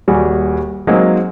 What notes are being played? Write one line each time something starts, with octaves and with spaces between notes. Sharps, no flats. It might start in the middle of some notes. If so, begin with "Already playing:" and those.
D#1 G3 F#4 G#4
F#3 G#3 A#3 C4 D#4